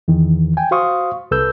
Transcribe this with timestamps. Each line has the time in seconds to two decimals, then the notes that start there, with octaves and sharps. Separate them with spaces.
0.08 E2 D#3 E3
0.57 G5 G#5
0.71 F#4 C5 F5 C6 C#6 D#6
1.31 C2 A4 B4 E6 G6